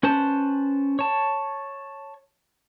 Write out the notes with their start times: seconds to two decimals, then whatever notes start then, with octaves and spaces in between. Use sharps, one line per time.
0.03 C#4 B4 C5 A5
0.99 C#5 A5